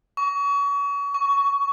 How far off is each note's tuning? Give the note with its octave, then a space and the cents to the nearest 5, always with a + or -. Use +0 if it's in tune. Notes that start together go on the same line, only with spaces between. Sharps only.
C#6 +35
C#6 +15